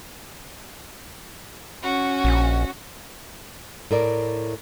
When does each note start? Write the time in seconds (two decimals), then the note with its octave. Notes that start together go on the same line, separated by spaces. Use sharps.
1.81 C#4 F#4
2.24 A#1
3.91 A2 A#4 D5